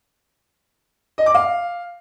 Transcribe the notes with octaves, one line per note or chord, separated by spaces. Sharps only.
D#5
D6
F5